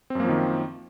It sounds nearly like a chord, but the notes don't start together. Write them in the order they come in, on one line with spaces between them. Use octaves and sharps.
C4 F#2 A#3 F3 D#3